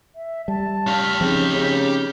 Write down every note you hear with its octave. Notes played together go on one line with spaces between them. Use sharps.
E5
G3 A5
G4 F5
C#3 F3 C4 D#4
C#3